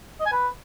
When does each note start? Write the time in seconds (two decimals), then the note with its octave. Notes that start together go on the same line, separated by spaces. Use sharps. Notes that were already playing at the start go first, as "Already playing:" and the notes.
0.20 D#5
0.26 G#5
0.32 B4